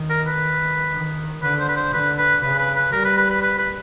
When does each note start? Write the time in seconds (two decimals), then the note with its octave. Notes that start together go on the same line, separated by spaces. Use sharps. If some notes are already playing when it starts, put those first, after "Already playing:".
Already playing: D#3
0.10 A#4
0.27 B4
0.93 D#3
1.42 D3 B4
1.60 C5
1.69 B4
1.77 C5
1.93 D3 B4
2.18 B4
2.43 C#3 B4
2.59 B4
2.76 B4
2.92 G3 A#4
3.05 B4
3.17 B4
3.30 B4
3.42 B4
3.59 B4